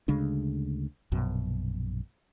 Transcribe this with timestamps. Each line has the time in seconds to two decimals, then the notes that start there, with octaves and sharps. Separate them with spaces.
0.08 D2 C#3 G#3 D4
1.12 A#1 F#2 B2